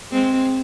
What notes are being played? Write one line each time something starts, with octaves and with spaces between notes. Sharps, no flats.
G#3 C4